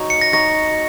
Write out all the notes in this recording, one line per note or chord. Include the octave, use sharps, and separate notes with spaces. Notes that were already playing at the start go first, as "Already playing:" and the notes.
Already playing: D#4 F#4 C#5
C#7
A#6
D#4 F#4 C#5 A#6